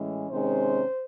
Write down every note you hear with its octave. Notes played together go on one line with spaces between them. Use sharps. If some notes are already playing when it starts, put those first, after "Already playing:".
Already playing: A2 E3 G#3 C#4
C3 D#3 G#3 C#4 C5